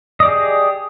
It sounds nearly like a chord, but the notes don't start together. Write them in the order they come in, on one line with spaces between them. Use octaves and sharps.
D#5 D5 G4 G#4